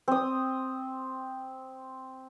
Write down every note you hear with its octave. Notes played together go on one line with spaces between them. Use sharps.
C4 D#6